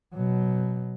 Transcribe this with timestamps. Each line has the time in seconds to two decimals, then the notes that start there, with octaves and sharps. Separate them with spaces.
0.13 B2 F#3